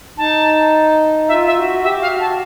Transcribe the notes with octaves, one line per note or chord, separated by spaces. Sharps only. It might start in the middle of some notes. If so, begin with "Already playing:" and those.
D#4 A5
F4 E5
E5
F#4
G4 E5
F5
F#4
A5